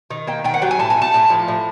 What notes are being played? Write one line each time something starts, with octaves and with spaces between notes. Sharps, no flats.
D#3
A#3 G5
D#3 G5
F#5
F#3 G5
G#5
A2 A5
G#5
A3
A5
A2
F3
A2